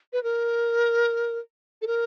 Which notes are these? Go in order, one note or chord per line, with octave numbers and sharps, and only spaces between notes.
B4
A#4
A4
A#4